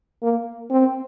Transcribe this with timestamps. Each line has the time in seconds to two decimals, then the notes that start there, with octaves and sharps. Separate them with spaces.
0.22 A#3
0.70 C4